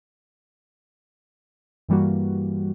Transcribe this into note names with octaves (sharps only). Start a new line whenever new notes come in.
G2 E3 G3 A#3 F#4